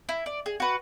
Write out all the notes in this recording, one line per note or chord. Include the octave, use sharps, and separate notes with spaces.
E4
D5
G#4
F#4 B4